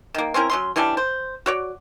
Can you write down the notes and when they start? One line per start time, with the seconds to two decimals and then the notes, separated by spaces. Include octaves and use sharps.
0.14 D#3 A#3
0.34 C4 C#4 E4 A#4
0.50 F#3 C#4 C6
0.76 E3 G3 C#4 D4
0.97 C5
1.46 F#4 C#5 D5